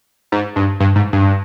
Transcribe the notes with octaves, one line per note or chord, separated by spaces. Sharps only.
G#2
G2
G2
G#2
G2